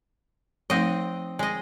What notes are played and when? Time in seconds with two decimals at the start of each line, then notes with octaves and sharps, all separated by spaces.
0.70 F3 A3 C4 D#4 D#5
1.39 G#3 D#5